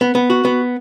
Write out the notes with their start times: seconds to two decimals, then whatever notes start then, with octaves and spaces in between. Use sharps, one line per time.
0.01 B3
0.15 B3
0.30 F#4
0.45 B3